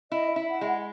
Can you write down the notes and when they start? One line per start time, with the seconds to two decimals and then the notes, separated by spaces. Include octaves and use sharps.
0.12 E4 D#5
0.30 E5
0.36 E4
0.48 F#5
0.61 G#3 E5
0.67 F#5